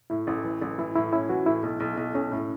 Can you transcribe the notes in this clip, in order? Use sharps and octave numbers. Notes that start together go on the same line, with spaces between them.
A2 E4
A1
E3
A1
E3 E4
A2 E4
C#4 E4
E3 F#4
A2 E4
B1
B1
B1
B1 C#4
A2